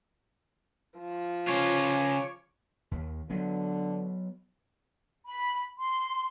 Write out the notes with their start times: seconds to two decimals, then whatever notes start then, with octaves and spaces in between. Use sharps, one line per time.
0.99 F3
1.47 C#3 F4 C#5 C#6 D6
2.91 D#2
3.30 D3 F#3 B3
5.26 B5
5.78 C6